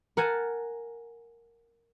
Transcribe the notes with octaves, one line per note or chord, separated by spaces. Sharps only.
A#4 F#5 G#5 A5